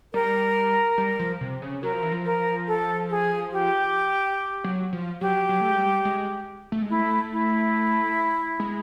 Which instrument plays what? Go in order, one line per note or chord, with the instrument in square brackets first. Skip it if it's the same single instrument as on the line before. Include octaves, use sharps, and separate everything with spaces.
[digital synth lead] G3 [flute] A#4
[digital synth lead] G3
F3
C3
C#3
[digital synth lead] F#3 [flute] A#4
[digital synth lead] F3
E3
F3
[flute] A#4
A4
G#4
G4
[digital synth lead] F#3
F3
[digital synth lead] F#3 [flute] G4
[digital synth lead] F#3
A3
G#3
G3
G#3
A3
G#3
[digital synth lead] A3 [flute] E4
[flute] E4
[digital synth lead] G#3